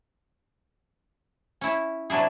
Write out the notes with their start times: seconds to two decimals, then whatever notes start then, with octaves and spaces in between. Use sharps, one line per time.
1.61 C#4 E4
2.10 C3 F#3 D4 E4 G#4